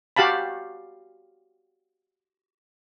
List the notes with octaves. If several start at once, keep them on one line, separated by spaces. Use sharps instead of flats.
F#4 G4 F5 A5 B5